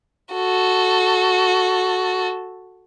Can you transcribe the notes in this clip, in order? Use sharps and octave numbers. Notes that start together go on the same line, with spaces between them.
F#4 A4